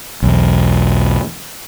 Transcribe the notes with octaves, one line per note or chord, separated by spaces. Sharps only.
B1 E2